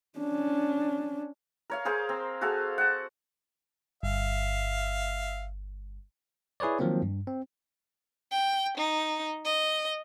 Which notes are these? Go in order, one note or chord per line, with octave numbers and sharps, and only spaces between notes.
C#4 D4
A#4 C#5 F5
G#4 A#4 C5 F5
C4
F#4 G#4 A4 F5
F#5 A5
G1 E5 F5
E4 G#4 B4 C#5 D5
D#3 F3 F#3 A#3 C4
G2
C4
G5
D#4
D#5